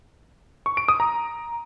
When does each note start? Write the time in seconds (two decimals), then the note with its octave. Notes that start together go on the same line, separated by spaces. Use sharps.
0.66 C#6
0.77 D7
0.88 D#6
1.00 A#5